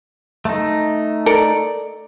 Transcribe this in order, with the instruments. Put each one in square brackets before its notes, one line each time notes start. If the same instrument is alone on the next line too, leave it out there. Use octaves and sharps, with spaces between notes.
[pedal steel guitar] A3 D#4
[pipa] A4 A#4 D5